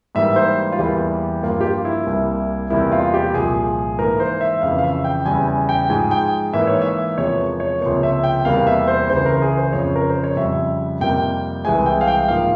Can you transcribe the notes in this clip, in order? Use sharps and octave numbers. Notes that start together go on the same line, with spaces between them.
G#2 E3 G3 A#3 E5
C5
F4
E2 E3 G3 A#3 G4
G2 F3 A#3 F4
G4
F4
E4
C2 C3 G3 A#3
E2 C3 G3 A#3 E4
F4
G4
C2 A#2 F3 G#4
G#2 E3 A#3 A#4
C5
E5
F2 C#3 E3 F5
F5
E5
G5
E2 C#3 G3 G#5
G#5
G5
G#2 F3 G#3 G#5
G5
G#2 E3 A#3 E5
C#5
E5
E2 C3 F3 G#3 C#5
A#4
C#5
C#2 C3 F3 A#3 C#5
E5
G5
E2 C3 G3 A#3 F5
E5
C5
C#2 C#3 E3 C5
A#4
G#4
C5
F2 C#3 F3 C#5
A#4
C5
C#5
F2 C#3 G3 E5
F2 C3 G3 A#3 G5
C2 C3 E3 G#3 G#5
G5
F5
G5
G#2 F3 A#3 F5